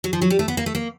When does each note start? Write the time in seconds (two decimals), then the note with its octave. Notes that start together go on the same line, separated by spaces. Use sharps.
0.04 F#3
0.13 F3
0.22 F#3
0.30 G3
0.39 A3
0.48 B3
0.57 A#3
0.66 A3
0.75 A#3